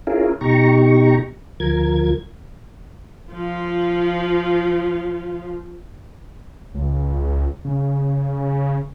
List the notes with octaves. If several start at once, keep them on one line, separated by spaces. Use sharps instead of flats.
C#4 E4 F4 G#4 A#4
B2 D#4 G4 A#5 C#6
D2 F3 A#4 G#6
F3 F4
C#2
C#3